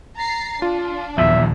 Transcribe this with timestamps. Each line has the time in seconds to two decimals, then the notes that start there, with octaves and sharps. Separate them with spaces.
0.17 A#5 A6 C7
0.62 D4 F4
1.18 D#1 B1 E2 F3 E5